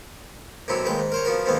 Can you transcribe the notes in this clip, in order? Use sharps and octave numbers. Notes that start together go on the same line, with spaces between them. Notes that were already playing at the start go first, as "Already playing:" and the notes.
B1 F#2 C3 F#3 E4 F#4
A1 D#2 G#3 B4 G5
G#2
A#4 C5 C#5
F3 B3 F#4 A#4
B1 F2 G#2 D#3 A#3 B3